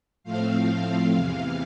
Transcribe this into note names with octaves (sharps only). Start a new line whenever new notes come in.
A2 F3 A3 C4 F5
E2 C3 E3